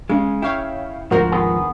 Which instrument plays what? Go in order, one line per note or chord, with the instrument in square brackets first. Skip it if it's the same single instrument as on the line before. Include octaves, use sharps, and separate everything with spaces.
[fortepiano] C#3 [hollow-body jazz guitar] G#3
[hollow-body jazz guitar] E4 [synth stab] C#5 F5 G5
[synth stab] D2 A#4 C5 [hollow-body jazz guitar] G#2 F3 [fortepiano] F#4
[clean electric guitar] D#3 B3 G#4